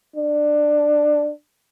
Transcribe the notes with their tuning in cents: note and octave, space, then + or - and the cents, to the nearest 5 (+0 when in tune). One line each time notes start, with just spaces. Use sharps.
D4 +15